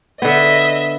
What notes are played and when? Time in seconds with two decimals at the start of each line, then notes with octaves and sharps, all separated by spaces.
0.22 D3 B3 D#5 E5